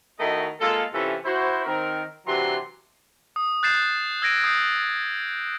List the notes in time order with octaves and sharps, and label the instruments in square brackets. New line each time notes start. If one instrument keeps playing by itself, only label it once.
[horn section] D#3 A3 E4 F#4 D#5
G#3 A#3 F4 A4
C3 E3 C#4 E4 F4 A4
E4 F#4 C5
D#3 C4 A#4
C3 E3 F#3 D4 A#5 C6
[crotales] D#6
F#6 G6 A6 C7 E7
E6 G#6 A#6 D7 D#7
D#6 G6 A#6 C7